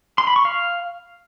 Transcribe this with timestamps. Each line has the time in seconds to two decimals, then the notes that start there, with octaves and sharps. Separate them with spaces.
0.18 C6
0.27 B5
0.36 C#6
0.45 F5